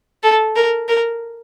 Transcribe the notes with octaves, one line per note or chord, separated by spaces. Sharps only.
A4
A#4
A#4